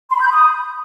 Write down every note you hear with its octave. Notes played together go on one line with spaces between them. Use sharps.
C6
B5
G6
B5
D#6